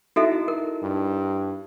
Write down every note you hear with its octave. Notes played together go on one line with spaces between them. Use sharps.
D#4 E4 F#4 A4 E5
A#4
G2